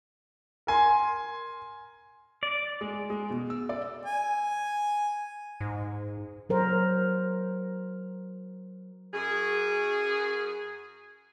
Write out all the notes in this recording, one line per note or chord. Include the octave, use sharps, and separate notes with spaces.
A#4 G#5 C6
D5
G#3
G#3
B2
E6
D5
G#5
G#2
F#3 A#4 C5
F#2 G#4